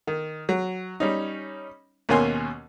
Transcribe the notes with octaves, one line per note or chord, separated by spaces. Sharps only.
D#3
F#3
G3 C#4 D#4
D#2 B2 A#3 C#4 G#5 C6